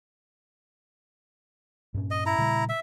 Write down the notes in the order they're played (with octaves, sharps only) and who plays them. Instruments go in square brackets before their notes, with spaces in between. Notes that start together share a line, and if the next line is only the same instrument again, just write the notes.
[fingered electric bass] G2 A#2 C#4
[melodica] D#5
E4 A#5
[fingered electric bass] A#2 C#3 G3
[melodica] E5